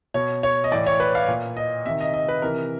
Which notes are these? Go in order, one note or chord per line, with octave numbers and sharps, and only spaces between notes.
B2 C#5
C#5
D#5
A2 E3 D5
C#5
B4
F5
A#2
D#5
C3 D#3 E5
D#5
D#5
B4
C3 E3 A#4